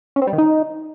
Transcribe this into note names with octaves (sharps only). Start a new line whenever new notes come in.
C#4
C4
G3
D#3
D#4